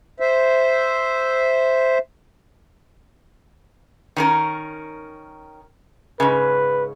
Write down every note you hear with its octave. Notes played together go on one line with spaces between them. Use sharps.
C5 E5
D#3 C#4 A#4
G#2 C#3 B4